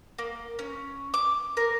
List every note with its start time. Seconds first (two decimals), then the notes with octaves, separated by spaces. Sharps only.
0.19 A#3
0.59 C#4
1.14 D6
1.57 A#4